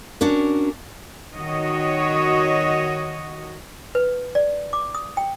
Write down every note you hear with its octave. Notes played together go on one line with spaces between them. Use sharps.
C#4 D4 F#4 A#4
D#3 F#4 C#5 D#5
B4
D5
D6
D#6
G5